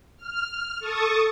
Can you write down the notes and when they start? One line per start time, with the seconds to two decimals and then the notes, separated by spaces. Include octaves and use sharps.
0.17 F6
0.80 A4 A5 C#6 D#6